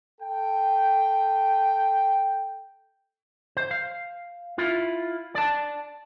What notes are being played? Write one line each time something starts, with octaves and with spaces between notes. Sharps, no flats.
A4 G5
C5
F5
E4 F4
D5 A5